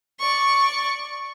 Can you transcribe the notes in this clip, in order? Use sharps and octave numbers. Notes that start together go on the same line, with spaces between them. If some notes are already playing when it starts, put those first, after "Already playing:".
D5 C#6